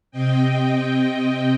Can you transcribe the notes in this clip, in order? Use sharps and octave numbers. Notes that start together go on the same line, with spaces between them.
C3 C4 D#5 G5